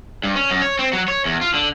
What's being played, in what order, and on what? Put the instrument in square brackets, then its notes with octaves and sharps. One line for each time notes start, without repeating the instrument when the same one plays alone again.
[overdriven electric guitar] G2
C#4
F#2
C#5
C4
F#3
C#5
E2
F4
D3